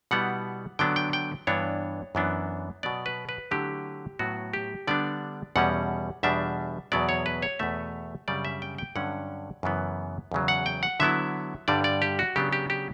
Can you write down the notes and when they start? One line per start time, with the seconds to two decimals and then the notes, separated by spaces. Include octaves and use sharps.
0.11 B2 G3 B3 E4 F#5
0.79 D3 F#3 B3 D4 G5
0.96 G5
1.13 G5
1.47 G2 E3 B3 D4 C#5
2.15 F#2 E3 B3 D4
2.83 B2 F#3 B3 D5
3.06 B4
3.29 B4
3.51 D3 F#3 A3 E4 G4
4.19 A2 F#3 B3 F#4
4.53 G4
4.87 D3 G3 B3 D4 D5
5.56 E2 B2 G3 C#4 F#5
6.23 E2 B2 G3 D4 E5
6.92 E2 B2 F#3 B3 D5
7.09 C#5
7.26 B4
7.42 C#5
7.59 E2 B2 A3 E5
8.28 F#2 C#3 G3 D4 D5
8.45 E5
8.62 G5
8.78 G5
8.96 G2 D3 F#3 C#4 F#5
9.63 F#2 C#3 E3 B3
10.32 E2 C#3 F#3
10.48 F#5
10.66 G5
10.83 F#5
11.00 D3 F#3 B3 E4 E5
11.68 G2 D3 G3 D5
11.84 D5
12.02 G4
12.19 F#4
12.36 C#3 F#3 B3 D4 G4
12.53 G4
12.70 G4